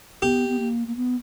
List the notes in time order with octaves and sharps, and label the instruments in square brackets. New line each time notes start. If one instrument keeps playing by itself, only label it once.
[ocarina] B3 [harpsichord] G4
[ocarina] B3
A#3
A#3
B3